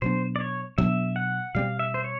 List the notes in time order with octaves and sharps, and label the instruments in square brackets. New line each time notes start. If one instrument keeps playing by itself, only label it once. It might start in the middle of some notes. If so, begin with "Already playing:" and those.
[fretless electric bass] B2 F#3 B3 D4 [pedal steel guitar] C5
[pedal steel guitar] D5
C#5
[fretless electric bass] B2 F#3 B3 D4 [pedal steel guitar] E5
[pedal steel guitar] F#5
[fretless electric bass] B2 G3 C4 [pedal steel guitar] F5
[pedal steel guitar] E5
C5
C#5